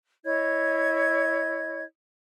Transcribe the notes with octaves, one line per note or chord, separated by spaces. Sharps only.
E4 C#5 D#5 G#6